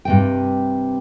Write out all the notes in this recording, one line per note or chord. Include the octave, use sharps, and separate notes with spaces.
G2 C3 G5